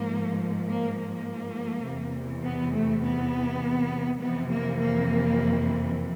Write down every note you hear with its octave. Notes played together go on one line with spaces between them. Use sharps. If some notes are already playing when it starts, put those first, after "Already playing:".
Already playing: G#2 F3 A#3
A#3
A#3
E2 C3 E3
B3
A3
B3
F2 C3 E3 B3
A#3
A#3